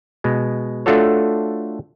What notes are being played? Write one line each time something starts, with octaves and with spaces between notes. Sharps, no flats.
B2 G#3
A3 D4 F4 F#4 A4 C#5